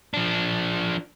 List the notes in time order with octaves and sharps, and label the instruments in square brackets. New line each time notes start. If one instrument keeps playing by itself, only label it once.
[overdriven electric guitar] F3 D4